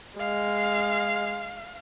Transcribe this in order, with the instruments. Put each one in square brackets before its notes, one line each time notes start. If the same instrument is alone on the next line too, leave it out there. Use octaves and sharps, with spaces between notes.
[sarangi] G#3 [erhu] F5